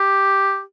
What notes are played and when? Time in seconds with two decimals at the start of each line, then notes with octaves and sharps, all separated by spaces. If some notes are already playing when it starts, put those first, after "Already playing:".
Already playing: G4